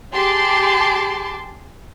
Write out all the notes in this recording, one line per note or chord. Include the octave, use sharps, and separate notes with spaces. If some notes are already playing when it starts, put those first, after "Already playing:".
G4 G#4 A5 C6 D6